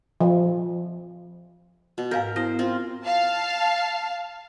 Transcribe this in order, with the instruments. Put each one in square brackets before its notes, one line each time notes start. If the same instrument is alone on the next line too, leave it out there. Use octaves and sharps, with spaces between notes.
[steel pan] F3
[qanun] B2
[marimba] G#2 F5 G6 [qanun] A#4
[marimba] B3 E4 A#6 [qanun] C5
[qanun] C4 F4
[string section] F5 A5